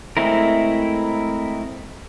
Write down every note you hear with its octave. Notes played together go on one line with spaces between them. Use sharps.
G#3 A3 C4 E4 A#4